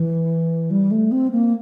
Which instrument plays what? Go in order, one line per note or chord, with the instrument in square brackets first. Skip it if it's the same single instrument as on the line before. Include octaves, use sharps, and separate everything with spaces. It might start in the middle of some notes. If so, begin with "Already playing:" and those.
Already playing: [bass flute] E3
G3
A3
C4
A#3